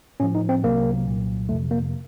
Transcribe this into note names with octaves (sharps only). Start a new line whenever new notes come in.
A2 F3 C#4
D#4
C4
C2 C3 F#3 A#3
C2 A#2 F#3
F2 C3 F3 A3
A#3